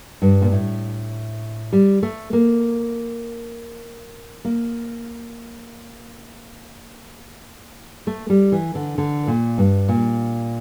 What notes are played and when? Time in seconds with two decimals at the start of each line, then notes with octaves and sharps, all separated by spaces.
0.22 G2
0.42 A#2
0.52 A2
1.73 G3
2.03 A3
2.33 A#3
4.45 A#3
8.07 A3
8.30 G3
8.52 E3
8.75 D3
8.98 D3
9.27 A#2
9.58 G2
9.88 A#2